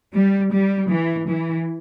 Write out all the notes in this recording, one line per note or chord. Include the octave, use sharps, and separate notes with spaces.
G3
G3
E3
E3